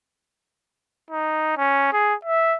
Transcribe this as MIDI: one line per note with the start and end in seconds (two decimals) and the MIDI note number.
1.11 1.54 63
1.57 1.90 61
1.93 2.14 68
2.25 2.57 76